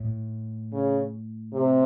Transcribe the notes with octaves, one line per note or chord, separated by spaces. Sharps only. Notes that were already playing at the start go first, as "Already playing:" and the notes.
Already playing: A2
C#3
C3